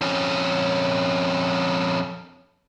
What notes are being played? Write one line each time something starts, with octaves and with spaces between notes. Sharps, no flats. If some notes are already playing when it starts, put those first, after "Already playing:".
F2 C#4